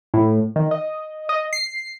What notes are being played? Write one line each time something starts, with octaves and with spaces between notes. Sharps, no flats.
A2
D#3
D#5
D#5
C7